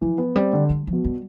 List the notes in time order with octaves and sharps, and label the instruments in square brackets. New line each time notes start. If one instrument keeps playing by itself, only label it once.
[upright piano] E3 [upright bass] F3
[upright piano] B3
[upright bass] G3 [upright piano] C4
[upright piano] D3
[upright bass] G3
F3
[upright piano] B2
[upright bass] G3